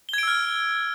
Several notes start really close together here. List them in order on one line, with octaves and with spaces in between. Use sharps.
G7 G#6 D7 E6 F6